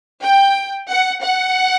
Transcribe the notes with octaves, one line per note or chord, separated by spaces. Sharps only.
G5
F#5
F#5